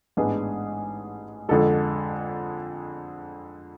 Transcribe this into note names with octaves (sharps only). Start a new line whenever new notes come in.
A1 G#2 G#3 B3 D4 G#4
F2 D3 G#3 A4